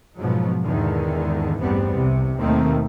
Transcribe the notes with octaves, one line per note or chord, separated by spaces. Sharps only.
G#2 B2 F3 F#3
E2 G#2 D3 D#3
A1 E2 G2 G3 B3 C4
C2 C3
D#2 B2 D#3 A3 A#3 C4